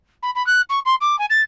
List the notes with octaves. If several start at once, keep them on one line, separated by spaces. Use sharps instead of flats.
B5
B5
F#6
C#6
C6
D6
G#5
A6